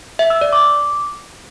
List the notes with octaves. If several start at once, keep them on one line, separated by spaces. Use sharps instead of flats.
E5
E6
D5
D6